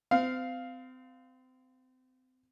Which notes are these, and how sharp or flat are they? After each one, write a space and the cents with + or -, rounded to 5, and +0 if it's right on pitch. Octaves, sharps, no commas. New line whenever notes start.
C4 -35 F5 +0